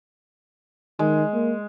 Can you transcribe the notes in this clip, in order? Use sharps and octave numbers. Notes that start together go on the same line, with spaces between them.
D#3 G#3
A#3